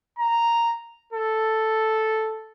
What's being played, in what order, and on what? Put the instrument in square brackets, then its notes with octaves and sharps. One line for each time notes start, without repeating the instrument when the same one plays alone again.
[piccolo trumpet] A#5
A4